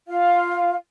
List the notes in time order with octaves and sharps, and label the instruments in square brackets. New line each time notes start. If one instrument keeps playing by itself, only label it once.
[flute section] F4 F5